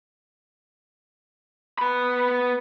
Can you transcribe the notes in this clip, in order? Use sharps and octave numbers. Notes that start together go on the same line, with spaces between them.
B3 B5